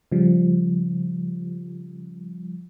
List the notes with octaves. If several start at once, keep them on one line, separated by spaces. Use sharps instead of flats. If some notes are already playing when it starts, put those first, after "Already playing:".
C#3 F3 G3